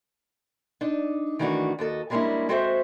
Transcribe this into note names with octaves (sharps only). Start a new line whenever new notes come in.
D4 D#4
D#3 E3 A3 D4 F#4
D#2 F#4 A4 D#5
G3 G#3 A#3 C#4 D4 E4
G#3 C4 F#4 A4 C5 E5